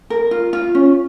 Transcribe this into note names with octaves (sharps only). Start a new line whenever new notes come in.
A#4
F4
F4
C#4